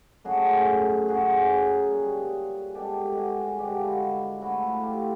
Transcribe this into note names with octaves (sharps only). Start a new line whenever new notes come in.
F#2 C#3 F#3 A3 F#4 G#4
F#2 C#3 F#3 F#4 G#4
A#2 G3
B2 G#3 G4 A4
F#4 G#4
G2 D3 F3 G#3 G4
F#4
F4
E4 F#4
A2 F3 A3 E4 F#4
F4 G4